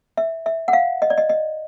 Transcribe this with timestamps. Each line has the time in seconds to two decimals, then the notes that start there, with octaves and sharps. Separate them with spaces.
0.17 E5
0.46 E5
0.68 F#5
0.73 F5
1.02 D#5
1.10 D5
1.18 D#5
1.29 D#5